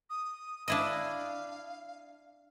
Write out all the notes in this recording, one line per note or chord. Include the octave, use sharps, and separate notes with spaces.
D#6
D4 E4 D#5 F5